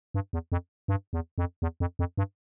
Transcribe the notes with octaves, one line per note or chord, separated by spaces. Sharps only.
G2
E2
F2
G2
E2
F2
E2
F2
F2
G2